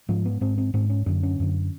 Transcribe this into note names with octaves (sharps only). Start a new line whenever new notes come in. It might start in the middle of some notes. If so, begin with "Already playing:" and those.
G#2 F3
B3
G#2 C4
C4
G#2 C4
C#4
F#2 D3 D4
C#4
F#2 D3